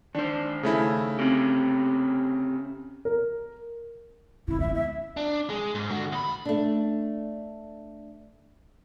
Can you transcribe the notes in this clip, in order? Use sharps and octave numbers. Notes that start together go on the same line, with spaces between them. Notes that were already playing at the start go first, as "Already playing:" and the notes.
D#3 D4 C5
C#3 A3 E4
C4 C#4 G4
A#4
D2 C#3 E4
C#2 B3 E5
E5
D4
G#3
G#2
D3 F#4
D#2 B5
A3 D4